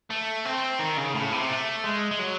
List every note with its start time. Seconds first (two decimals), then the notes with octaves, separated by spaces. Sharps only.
0.10 A3
0.45 C4
0.79 D#3
0.97 C#3
1.15 A2
1.32 C3
1.49 A3
1.84 G#3
2.11 G#3
2.19 F#3